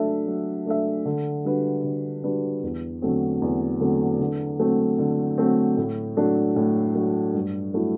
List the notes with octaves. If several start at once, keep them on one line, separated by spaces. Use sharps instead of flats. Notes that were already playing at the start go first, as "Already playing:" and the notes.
Already playing: F#3 A3 D4 A4 E5
F#3
A3 D4 A4 E5
D3
G3 D4 F#4 B4
D3
G3 D4 F#4 B4
E2
D3 F#3 A3 C4
E2
D3 F#3 A3 C4
D3
F#3 A3 C4
D3
F#3 A3 C4
A2
F#3 A3 D4
A2
F#3 A3 D4
G2
F#3 A3 E4